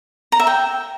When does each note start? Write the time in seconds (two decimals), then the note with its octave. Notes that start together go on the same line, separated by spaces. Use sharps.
0.32 A#5
0.40 E5
0.47 G5